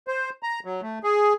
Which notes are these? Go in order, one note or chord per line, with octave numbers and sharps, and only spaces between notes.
C5
A#5
F#3
A3
G#4